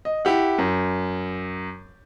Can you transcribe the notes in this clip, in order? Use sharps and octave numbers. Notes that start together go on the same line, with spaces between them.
D#5
E4 G4 F#5
F#2